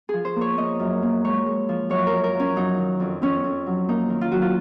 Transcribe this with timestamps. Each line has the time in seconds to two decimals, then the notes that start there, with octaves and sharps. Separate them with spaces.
0.09 F3 G#4
0.25 C5
0.36 A#3
0.41 C#5
0.58 A#3 D#5
0.80 F#2
1.03 A#3
1.25 G#3 C#5
1.46 G#3
1.69 F3
1.90 F#2 C#5
2.07 F#2 A#4
2.24 A#4
2.35 F3 C#4
2.56 F#3 D#4
2.78 D#3
3.00 F2
3.22 F2 C#4
3.44 F2
3.67 F#3
3.89 A#3 D#4
4.10 D#3
4.21 F4
4.32 F#3 F#4
4.42 F4